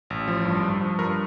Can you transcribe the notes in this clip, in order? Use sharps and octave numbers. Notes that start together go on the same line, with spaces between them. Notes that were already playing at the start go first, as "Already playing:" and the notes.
A1
F3
G2
G2
F3
G2 A#4